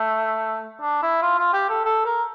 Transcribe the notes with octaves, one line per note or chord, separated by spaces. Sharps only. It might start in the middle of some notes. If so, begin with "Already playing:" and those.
Already playing: A3
D4
E4
F4
F4
G4
A4
A4
A#4